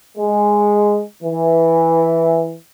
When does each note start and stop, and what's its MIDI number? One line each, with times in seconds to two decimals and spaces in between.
0.18 1.02 56
1.23 2.54 52